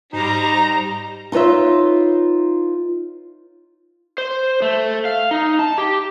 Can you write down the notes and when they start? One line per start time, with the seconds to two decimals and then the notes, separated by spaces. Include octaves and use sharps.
0.13 G#2 G3 D#4 C5 A#5
1.32 D#4 F4 B4 C#5 E5
4.18 C5
4.62 A3
5.05 F5
5.31 D#4
5.59 A5
5.78 G4